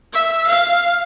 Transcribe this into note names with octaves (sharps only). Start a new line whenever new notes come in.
E5
F5